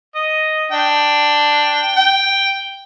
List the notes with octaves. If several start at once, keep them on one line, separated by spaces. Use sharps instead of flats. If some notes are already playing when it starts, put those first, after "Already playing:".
D#5
D4 G5
G5